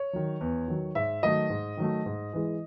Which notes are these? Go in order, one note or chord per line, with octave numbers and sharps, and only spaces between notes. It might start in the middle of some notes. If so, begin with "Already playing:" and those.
Already playing: C#5
D#3 F#3
E2
D#3 F#3
G#2 E5
D#3 F#3 A3 D#5
G#2
D#3 F#3 A3
G#2
E3 G#3